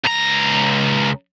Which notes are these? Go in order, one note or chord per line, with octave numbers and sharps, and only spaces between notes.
C#2 A#5